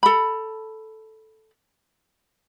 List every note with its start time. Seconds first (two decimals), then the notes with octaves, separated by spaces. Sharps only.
0.03 A4 B5